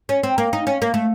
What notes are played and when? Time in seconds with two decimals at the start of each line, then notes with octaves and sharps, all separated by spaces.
0.09 C#4
0.23 C4
0.38 A#3
0.53 D#4
0.67 C#4
0.82 A#3
0.94 A3